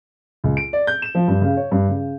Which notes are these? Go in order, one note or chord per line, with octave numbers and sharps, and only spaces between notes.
C#2
D7
D5
G6
E7
F3
G2
C#3
C#5
G2
C#3